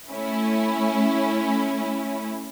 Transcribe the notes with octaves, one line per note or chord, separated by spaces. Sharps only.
A3 C#4 E4